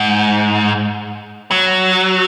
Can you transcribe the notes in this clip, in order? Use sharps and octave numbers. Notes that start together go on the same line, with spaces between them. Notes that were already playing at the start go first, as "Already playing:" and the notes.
Already playing: G#2
F#3